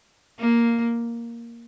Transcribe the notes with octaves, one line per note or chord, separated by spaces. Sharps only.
A#3